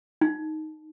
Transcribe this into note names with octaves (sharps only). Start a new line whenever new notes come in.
D#4